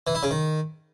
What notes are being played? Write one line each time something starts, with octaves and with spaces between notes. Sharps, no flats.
E3
E4
C#3
D#3